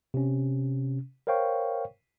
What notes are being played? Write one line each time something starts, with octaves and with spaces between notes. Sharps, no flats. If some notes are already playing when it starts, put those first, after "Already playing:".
C3 C#4
A#4 C5 C#5 F5 G5 C#6